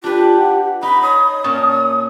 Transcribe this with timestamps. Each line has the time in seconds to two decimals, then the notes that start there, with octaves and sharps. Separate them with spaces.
0.04 D4 F4 G4 B4
0.38 F#5
0.83 D#4 B5
1.02 C#5 D#6
1.44 A#2 C#4 A5